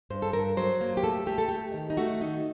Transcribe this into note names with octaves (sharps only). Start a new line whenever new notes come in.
G2 C5
A4
G2 A#4
F#3 C5
A#3
G4
A3 A4
A3 G4
A4
A3 G4
D#3
D#4
A3 F#4
D#3 D#4